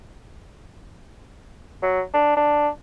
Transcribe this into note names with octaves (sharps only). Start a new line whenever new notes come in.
F#3
D4
D4